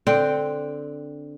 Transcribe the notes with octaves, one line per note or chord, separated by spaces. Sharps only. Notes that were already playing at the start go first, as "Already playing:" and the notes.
D3 C4 G5